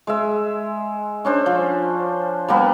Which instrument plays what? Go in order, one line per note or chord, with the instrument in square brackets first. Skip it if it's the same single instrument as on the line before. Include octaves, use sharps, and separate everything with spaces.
[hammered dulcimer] G#3 E5
C#4 D4 C5
F3
G3 A#3 B3